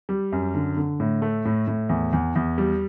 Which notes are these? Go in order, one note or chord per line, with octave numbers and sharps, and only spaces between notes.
G3
F#2
D3
D3
A2
A3
A2
A2
E2
E2
E2
G3